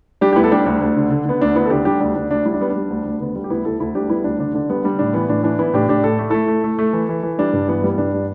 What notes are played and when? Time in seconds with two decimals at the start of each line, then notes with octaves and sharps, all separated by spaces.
0.21 G3 D4 G4
0.33 G4
0.36 D2 B3 E4
0.44 A4
0.52 G3 D4 G4
0.66 D2 D4
0.81 D2
0.96 D3
1.10 D3
1.26 D3 B3
1.41 D2 D4
1.56 D2 B3 E4
1.65 A4
1.70 D3 D4 G4
1.85 G3 D4 G4
2.00 D2 D4
2.15 D2 D4
2.30 D2 D4
2.45 G3 E4
2.54 D4
2.60 G3 B3
2.70 D4
2.76 G3
2.90 D2
3.05 D2
3.20 D3 B3
3.35 G3
3.44 G4
3.50 D2 B3 E4
3.65 D2 E4 A4
3.80 D2 E4 A4
3.95 G3 D4 G4
4.09 G3 B3 E4
4.24 D2 D4
4.39 D3 D4
4.54 D3 D4
4.70 G3 B3
4.84 G3 D4
4.99 A2 D4
5.14 E3 B3
5.29 A2 D4
5.44 E3 D4
5.59 E3 B3 E4
5.74 A2 D4 G4
5.88 A2 D4 G4
6.04 A2 A4
6.19 A3
6.30 A3 E4 A4
6.48 A3
6.64 A3
6.79 A3
6.93 E3
7.09 E3
7.23 E3
7.38 G3 D4
7.53 G2
7.68 E3 B3
7.84 G3
7.90 B3
7.98 G2 D4
8.14 G3